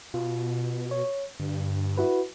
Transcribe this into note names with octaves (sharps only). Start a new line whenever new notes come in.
B2 F4
C#5
G2 D3
E4 F#4 B4